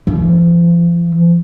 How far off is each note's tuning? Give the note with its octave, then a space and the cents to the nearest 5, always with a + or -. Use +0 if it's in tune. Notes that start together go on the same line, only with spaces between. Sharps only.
F3 -40